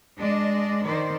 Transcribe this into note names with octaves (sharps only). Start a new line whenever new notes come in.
G#3 D4 D5 D#5
D#3 C5 D5